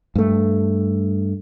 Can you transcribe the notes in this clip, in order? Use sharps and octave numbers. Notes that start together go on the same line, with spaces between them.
G2 A3